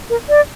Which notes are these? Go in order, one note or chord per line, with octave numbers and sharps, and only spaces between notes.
A#4
D5